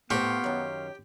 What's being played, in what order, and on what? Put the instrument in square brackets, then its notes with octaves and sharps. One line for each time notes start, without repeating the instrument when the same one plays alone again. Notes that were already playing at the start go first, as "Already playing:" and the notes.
[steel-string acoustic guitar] A2 C4 F#5 [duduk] B3 [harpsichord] G4 [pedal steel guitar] F5 C6 C#6
[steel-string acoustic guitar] F#2 D#3